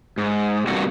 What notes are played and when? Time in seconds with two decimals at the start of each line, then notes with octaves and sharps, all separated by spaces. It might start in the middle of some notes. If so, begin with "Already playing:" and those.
0.18 G#2
0.67 G2 C3 A#3 F#4